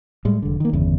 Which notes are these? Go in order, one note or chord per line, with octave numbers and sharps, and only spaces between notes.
A2 G3 G#3
F1 D3
D#3 A#3
G1 E2 C#3